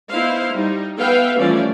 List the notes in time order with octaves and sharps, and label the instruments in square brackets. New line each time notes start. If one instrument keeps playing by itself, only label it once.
[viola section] B3 D#4 E4 C5 F5
G3 D#4
B3 B4 E5 F5 G5
E3 F3 G3 A3 C#4 D5